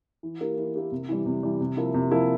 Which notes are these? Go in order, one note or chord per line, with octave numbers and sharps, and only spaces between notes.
E3
A#3 E4 G4 A#4
E3
A#3 E4 G4 A#4
C3
E3 G3
C3
E3 G3
C3
F3 A#3 E4
C3
F3 A#3 E4